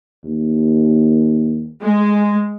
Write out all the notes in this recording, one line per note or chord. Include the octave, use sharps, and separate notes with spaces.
D#2
G#3